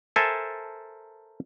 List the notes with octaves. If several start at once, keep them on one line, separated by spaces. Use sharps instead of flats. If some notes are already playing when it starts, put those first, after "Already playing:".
A4 A#4 C5 E5 G#5 A5